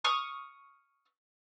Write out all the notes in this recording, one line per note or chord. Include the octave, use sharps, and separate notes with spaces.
C#6 D#6 F6